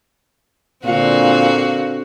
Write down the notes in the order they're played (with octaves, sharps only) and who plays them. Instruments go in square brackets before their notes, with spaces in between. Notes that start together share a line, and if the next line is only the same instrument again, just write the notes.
[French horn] A#2 [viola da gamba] D3 C4 [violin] F#4 [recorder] F5